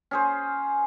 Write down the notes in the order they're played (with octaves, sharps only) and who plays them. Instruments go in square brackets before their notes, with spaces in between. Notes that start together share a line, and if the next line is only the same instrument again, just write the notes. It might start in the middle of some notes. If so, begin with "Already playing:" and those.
[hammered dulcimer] C#4 G#4 C5